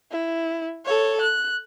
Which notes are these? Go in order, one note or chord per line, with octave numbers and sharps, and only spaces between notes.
E4
A4 C#5
F#6